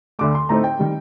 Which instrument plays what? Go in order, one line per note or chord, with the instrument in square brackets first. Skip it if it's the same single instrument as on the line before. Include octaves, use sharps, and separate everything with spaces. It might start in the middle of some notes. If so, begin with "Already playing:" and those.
[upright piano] D2 D3 A3 D6
C6
A2 A3 C4 D#4 A#5
G5
D#3 G3